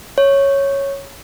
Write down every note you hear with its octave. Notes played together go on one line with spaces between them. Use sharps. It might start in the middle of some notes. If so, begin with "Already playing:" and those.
C#5